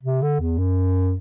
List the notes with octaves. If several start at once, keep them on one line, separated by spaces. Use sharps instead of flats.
C3
D3
E2
F#2